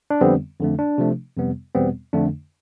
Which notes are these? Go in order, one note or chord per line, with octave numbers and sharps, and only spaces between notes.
D4
F2 D3 G3 B3 C4
F2 D3 A3
D4
C3 F3 A3
F2 C3 G3 B3
E2 B2 G3 B3 C4
F2 D3 A3 D4